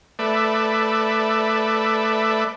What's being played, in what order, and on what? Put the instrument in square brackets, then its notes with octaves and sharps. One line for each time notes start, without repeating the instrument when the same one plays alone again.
[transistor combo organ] A3 B4 D5 E5